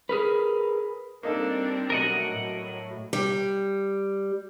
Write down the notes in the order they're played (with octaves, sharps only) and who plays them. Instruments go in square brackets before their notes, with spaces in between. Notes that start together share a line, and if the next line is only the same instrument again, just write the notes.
[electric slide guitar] G#4 A#4 B4
[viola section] G3 C4 D4 [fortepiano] A#3 D#4 A4
[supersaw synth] B2 F#3 A3 [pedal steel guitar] A#4 D#5 F#5
[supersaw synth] A2 [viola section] F#3
[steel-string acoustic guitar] G3